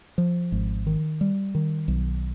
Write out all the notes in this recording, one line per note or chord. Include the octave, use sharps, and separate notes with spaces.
F3
G#1
D#3
G3
D#3
B1